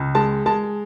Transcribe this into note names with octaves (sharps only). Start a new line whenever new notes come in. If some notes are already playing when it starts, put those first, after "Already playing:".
Already playing: C#2
G#3 A5
G#3 A5